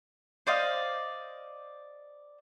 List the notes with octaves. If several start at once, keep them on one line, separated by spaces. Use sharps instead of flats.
C5 D5 D#5 F5